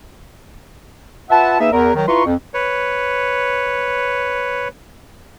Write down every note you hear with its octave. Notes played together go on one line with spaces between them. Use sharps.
F4 B4 E5 F#5 A5
A#3 D#4 G#4 B4 E5
E2 A#4
D#3 F#3
E4 F4 B4 A#5 C6 C#6
F2
B4 C#5